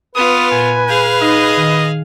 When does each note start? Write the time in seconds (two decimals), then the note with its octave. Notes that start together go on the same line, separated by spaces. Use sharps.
0.15 B3 F4 B4 D#6
0.51 A#2 G#5
0.88 G#4 F5 G6
1.21 D#4 D#5
1.57 D#3